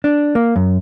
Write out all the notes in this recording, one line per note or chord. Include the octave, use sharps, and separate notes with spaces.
D4
A#3
F#2